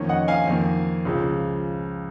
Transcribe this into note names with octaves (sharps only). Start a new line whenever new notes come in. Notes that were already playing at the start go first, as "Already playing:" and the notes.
Already playing: F2 D#3 A#3 C#4
D#5 F#5
F5 G#5
F2 D#3 A#3
C#2 C#3 F3